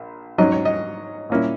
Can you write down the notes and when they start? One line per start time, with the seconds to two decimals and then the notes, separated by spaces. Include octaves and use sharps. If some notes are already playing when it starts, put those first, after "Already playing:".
Already playing: A#1
0.38 G#2 F#3 C#4 D#5
0.52 C#5
0.65 D#5
1.30 A#2 A#3 C#4 E4